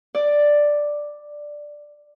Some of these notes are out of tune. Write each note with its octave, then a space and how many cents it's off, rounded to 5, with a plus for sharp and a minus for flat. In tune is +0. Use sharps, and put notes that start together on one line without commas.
D5 +5